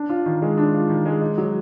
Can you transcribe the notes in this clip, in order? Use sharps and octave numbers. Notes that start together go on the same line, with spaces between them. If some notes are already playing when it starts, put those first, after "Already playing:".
Already playing: D4
F4
D#3
G#3
D4
F4
D#3
G#3
D#4
F#3